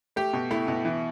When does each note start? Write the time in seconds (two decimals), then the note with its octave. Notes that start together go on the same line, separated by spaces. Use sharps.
0.16 A3 G4
0.33 B2
0.51 A3 E4
0.68 B2
0.85 E3